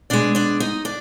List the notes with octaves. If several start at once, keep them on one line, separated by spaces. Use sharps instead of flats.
B2 G#3 D4 D5
D4 D5
D#4 D#5
D4 D5